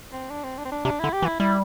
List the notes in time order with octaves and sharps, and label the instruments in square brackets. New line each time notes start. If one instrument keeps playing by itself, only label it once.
[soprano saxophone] C4
D4
C4
D4
C4
D4
[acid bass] C3 [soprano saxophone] D4
[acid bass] D3 [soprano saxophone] E4
[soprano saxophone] G4
[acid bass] E3
[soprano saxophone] E4
[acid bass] G3 [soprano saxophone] E4